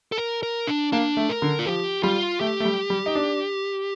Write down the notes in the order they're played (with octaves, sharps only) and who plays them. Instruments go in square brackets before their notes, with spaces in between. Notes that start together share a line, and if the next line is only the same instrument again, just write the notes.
[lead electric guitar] A4
A#4
A#4
D4
[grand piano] A#3 [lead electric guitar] D4
[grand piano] A3
[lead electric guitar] A#4
[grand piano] D3
[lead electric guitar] F4
[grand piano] F3 [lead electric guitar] G4
[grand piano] G3 [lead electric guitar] F4
[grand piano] A3 [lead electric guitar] G4
[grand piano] A3
G3
G3
D#4
D4